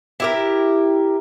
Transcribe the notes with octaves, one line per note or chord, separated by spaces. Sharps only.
E4 G4 A#4